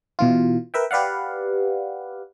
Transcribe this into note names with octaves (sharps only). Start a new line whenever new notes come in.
B2 E3 F4
A#4 B4 E5 G5
G4 B4 D5 F5 F#5